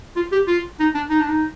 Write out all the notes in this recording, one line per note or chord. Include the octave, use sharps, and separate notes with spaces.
F4
G4
F4
D#4
D4
D#4
D4
D#4